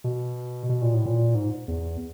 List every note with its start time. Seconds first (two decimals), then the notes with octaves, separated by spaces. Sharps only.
0.04 B2
0.69 B2
0.82 A#2
0.94 A2
1.06 A#2
1.35 G#2
1.68 E2